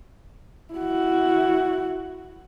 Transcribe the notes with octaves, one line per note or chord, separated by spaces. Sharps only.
E4 F#4